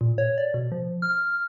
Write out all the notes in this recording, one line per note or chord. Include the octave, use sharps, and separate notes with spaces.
A#2
C#5
D5
B2
F3
F6